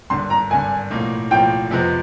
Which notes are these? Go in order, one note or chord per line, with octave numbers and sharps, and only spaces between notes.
G#1 G2 D3 C6
A#5
G#1 G2 D3 G#5
B1 A2 F3 A#3
B1 A2 F3 A#3 G5
F2 C3 F3 G#3 B3